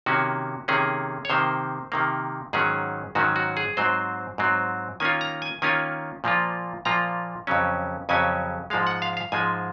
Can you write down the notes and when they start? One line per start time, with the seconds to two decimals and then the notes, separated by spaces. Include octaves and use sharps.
0.06 C3 D#3 A#3 C#4 F#4
0.68 C3 D#3 A#3 C#4 G#4
1.25 C#5
1.30 C3 D#3 A#3 C5
1.92 C3 D#3 A#3
2.53 G#2 D#3 F#3 C#4 G#4
3.15 G#2 D#3 F#3 C#4 F#4
3.36 F#4
3.57 G#4
3.77 G#2 F#3 C4 C5
4.38 G#2 F#3 C4
5.00 D#3 A#3 C#4 F4 G#5
5.21 A#5
5.42 G#5
5.62 D#3 A#3 C#4 F4 G#5
6.24 A#2 F3 A#3 F4
6.85 A#2 F3 A#3 F4 A#5
7.47 F2 C#3 F#3 C#4
8.09 F2 C#3 F#3 C#4 G#5
8.70 G#2 F3 G#3 F5
8.87 F#5
9.02 F5
9.17 F5
9.32 G#2 F3 G#3 G#5